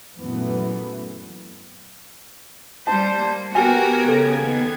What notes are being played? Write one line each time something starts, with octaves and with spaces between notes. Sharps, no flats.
F#2 A#2 E3 A3 B3
G3 C5 A5
A#3
B3 F#4 G4 A#4 G#5 G#6
C#3 A4
D#2 D#3